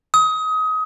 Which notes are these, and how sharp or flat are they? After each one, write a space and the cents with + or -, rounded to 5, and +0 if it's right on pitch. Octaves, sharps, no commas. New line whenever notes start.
D#6 +25